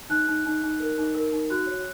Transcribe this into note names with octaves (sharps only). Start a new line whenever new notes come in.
D#4 F#6
D#4
D#4
D#4
A#4
D#4
A#4
D#4
F#4 F#6
C#5